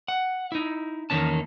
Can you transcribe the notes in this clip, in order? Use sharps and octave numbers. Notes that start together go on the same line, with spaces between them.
F#5
D#4 E4
E2 D#3 A#3 C#4 A5